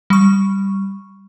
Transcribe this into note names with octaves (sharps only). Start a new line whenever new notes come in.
G3 C#6